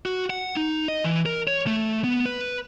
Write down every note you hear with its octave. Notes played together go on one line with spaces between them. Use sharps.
F#4
F#5
D#4
D#5
E3
A#4
C#5
A3
B3
B4